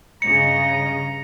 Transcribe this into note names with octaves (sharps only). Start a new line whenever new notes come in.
G2 C#3 D#5 A#5 C#7